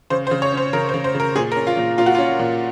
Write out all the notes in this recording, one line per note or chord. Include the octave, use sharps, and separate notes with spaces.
C#3 C5
C5
C#3
C#5
C#4 C5
C#3 A#4
C5
C#3
C5
C#3 A#4
A#2 G#4
A#4
C#4
F4
A#2
A#2 F4
F#4
C#4 F4
A#2